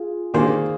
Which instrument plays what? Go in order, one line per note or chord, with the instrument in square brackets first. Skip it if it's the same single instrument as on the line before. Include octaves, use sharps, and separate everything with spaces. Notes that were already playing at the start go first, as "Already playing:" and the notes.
Already playing: [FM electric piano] F4 G#4
[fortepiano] D#3 A#3 D4 [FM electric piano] G#4 C5